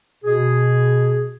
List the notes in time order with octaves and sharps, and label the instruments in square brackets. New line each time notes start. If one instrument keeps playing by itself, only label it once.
[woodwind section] B2 G#4